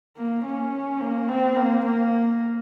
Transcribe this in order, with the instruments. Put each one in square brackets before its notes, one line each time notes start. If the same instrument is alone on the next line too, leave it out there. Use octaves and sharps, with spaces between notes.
[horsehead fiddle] A#3
C#4
A#3
C4
A#3
A#3